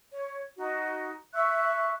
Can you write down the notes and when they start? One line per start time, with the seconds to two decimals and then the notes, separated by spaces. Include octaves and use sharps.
0.12 C#5
0.57 D#4 F#4
1.33 E5 C#6 E6 F#6